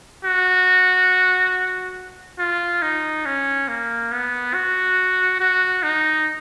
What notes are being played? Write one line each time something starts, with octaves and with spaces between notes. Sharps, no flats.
F#4
F4
D#4
C#4
A#3
B3
F#4
F#4
D#4